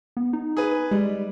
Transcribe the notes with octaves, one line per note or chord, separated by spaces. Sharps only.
B3
D#4
G#4 B4
G3 G#3